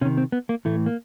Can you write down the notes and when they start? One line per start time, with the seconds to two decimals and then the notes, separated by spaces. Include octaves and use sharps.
0.01 C3 C#4
0.05 D#3
0.18 C4
0.32 B3
0.49 A#3
0.65 A2 E3 A3
0.86 A#3